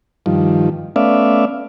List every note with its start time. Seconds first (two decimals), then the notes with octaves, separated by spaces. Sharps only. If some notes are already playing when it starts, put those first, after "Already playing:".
0.26 G2 D#3 F3
0.96 A3 B3 C#4 D5 E5 F5